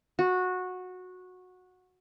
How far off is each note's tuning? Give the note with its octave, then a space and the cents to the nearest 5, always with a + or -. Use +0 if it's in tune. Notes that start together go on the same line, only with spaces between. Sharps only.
F#4 -15